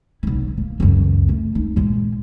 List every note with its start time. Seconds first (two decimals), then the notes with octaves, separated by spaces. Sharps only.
0.23 B1 E4
0.57 A#3
0.80 C#2 F#2
1.29 A3
1.55 D#4
1.76 A#2 G#3